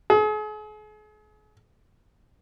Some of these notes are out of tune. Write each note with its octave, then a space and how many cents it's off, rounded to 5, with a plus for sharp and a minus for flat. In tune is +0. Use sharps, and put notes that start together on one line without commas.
G#4 +40